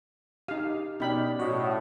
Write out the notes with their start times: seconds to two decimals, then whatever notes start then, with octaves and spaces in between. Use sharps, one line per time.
0.48 D#4 G4 F5
1.00 B2 C#4 D#4 D5 G5 B5 F6
1.40 A2 F#4 C#5 D#5